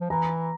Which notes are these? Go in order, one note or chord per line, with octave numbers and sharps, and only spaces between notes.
F3
E3 A#5